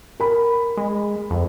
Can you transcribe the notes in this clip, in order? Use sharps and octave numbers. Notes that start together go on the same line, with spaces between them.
A#4 B5
G#3
F2